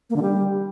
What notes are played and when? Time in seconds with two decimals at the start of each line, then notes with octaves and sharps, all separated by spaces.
0.10 A#3
0.16 D3
0.22 G3